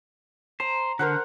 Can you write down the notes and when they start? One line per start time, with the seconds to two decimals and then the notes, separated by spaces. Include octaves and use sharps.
0.60 C5 A#5
0.99 D3 A#4 C5 F#5